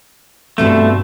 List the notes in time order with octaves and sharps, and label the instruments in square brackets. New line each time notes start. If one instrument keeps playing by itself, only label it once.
[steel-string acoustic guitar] G2 B2 C4 [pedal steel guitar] A3